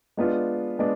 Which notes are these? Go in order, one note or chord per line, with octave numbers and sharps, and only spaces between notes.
G#3 B3 D4 F4
G#3 B3 D4